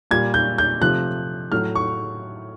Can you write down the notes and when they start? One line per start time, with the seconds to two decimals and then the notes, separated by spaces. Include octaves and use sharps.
0.11 A#2 G3 G#6
0.34 G6
0.58 G6
0.81 C3 F3 A3 F#6
1.52 A2 F#3 A3 F6
1.75 C#6